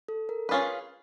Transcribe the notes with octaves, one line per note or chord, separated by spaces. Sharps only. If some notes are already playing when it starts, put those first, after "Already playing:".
A4
A#4
C#4 F4 G#4 B4